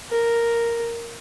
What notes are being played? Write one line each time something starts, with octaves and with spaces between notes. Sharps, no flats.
A#4